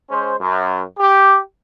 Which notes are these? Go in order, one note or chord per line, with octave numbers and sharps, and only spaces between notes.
G#3 C#4 C5
F#2
G4